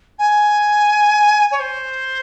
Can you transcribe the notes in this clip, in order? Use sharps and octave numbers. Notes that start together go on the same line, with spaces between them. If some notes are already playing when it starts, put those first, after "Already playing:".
G#5
C#5
C5